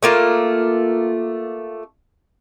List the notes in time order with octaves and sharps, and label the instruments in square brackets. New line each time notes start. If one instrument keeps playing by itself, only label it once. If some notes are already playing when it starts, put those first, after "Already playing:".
[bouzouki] A3 A#3 F4